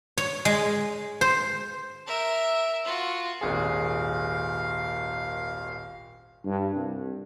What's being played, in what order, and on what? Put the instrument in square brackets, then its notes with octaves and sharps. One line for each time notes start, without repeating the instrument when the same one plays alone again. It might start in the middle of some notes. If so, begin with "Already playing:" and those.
[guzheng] C#5
G#3
C5
[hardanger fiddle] A#4 E5
F4 F#4
[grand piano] D#1 G#1 G#4 [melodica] F5
[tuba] G2
C2